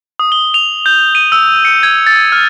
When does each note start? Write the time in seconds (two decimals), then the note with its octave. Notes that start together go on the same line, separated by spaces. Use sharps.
0.19 D#6
0.32 G7
0.54 F7
0.86 G6
1.15 D#7
1.32 E6
1.65 C#7
1.83 G#6
2.07 A6
2.32 F6